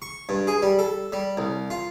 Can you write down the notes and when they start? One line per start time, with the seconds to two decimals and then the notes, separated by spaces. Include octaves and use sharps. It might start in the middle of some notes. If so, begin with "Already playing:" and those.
0.02 C#6
0.29 G2
0.47 G#4
0.62 G3
0.79 A4
1.12 G3
1.37 C2
1.70 F4